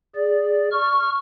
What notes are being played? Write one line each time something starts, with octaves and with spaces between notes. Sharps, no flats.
G#4 D5
C#6 F6